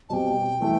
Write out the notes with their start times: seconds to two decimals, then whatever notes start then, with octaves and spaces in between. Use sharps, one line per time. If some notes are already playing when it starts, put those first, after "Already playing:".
0.09 B2 G3 C4 G4 G5 A5
0.60 E3 A3 E4